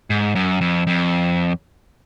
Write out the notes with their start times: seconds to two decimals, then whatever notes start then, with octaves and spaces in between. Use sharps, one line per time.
0.10 G#2
0.35 F#2
0.61 F2
0.87 F2